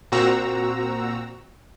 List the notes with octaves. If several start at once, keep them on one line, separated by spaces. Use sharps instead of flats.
A#2 C4 F#4 A#5 E6